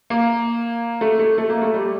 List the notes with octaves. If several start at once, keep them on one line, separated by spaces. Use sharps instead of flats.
A#3
A3
A3
A3
A#3
A3
G3